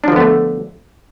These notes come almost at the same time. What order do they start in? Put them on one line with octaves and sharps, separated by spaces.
D4 F3 D3 B3 A3